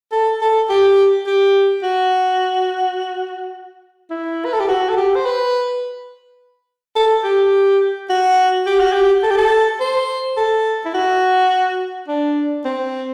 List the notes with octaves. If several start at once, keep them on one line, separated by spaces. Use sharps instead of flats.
A4
A4
G4
G4
F#4
E4
B4
A4
G4
F#4
A4
G4
C5
B4
A4
G4
F#4
G4
F#4
G4
A4
G4
A4
C5
A4
E4
F#4
D4
C4